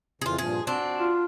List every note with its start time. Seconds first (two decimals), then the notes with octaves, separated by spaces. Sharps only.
0.21 F2 C#3 E3 F4 G#4
0.38 G2 A#2 F3 G#4
0.67 C4 D4 F#4
0.99 F4